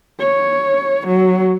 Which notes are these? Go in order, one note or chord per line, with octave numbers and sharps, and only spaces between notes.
C#5
F#3